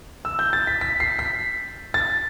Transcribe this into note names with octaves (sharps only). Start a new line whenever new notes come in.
E6
G6
A6
B6
B6
C7
B6
A6